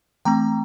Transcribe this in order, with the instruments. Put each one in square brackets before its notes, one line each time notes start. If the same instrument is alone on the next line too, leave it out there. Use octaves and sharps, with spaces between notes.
[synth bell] E3 A3 C4 G5 A#5